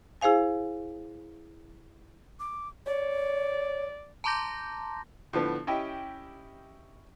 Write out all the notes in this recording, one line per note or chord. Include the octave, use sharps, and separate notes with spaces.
E4 G#4 C5 F5 G#5
D6
C#5 D5
A5 A#5 C6 D6 G6 A#6
A2 D3 F3 B3
C#4 E4 G4 D#5 G5